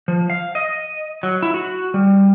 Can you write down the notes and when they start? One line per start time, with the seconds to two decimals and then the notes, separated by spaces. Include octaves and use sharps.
0.08 F3
0.30 F5
0.55 D#5
1.23 F#3
1.42 E4
1.54 F#4
1.94 G3